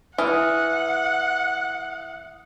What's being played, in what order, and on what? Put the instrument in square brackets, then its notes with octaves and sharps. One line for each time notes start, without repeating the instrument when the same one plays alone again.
[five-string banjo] E3 [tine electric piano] E5 D#6 F6 [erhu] F#5